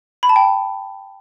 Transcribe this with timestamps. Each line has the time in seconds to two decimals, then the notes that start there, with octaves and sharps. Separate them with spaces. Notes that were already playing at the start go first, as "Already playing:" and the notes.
0.23 B5
0.29 A5
0.36 G5